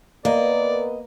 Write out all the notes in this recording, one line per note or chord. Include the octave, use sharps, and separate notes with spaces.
A#3 B3 A#4 B4 D5 D#5